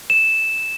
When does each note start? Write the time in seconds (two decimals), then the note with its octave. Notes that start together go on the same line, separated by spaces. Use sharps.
0.10 E7